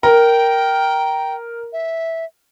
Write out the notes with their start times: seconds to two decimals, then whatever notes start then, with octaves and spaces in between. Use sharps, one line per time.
0.03 A#4 G5
1.73 E5